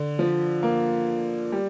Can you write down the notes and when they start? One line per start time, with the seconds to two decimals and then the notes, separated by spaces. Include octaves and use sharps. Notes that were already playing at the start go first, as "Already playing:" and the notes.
Already playing: D3
0.19 F3
0.63 A#3
1.52 G3